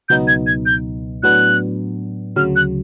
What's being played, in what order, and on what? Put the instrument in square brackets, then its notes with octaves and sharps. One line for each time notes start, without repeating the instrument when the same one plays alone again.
[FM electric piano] C#2 B2 F#3 B3 D#4 [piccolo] G6
[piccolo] G#6
G#6
G6
[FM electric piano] A2 F#3 B3 D4 [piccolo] F#6
[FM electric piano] D2 C#3 F#3 [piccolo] F6
[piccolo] F#6